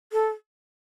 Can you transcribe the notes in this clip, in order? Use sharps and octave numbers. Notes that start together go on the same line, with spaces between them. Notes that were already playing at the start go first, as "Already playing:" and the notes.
A4